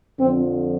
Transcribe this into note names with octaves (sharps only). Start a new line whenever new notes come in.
F2 D3 F3 C4